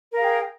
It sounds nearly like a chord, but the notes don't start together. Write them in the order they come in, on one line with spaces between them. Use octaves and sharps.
A#4 F5 G#4 G5